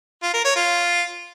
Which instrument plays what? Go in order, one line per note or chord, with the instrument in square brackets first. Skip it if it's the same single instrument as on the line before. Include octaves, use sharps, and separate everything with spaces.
[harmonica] F4
A#4
C#5
F4